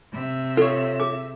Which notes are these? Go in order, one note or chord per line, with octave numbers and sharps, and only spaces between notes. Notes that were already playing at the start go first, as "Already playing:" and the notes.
C3 E5
F4 A4 C#5
G#4 D6